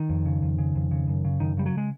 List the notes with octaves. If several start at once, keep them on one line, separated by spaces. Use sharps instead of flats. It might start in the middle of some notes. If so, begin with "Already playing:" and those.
Already playing: D#3
F2
C#3
F2
C#3
F2
C#3
F#2
C#3
F#2 D#3
C#3 G3
F#3
G#3